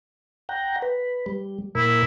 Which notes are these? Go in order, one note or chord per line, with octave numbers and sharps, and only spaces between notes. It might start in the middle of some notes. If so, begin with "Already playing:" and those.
F#5 G5 A#5
B4
G3
A#2 E4 A#4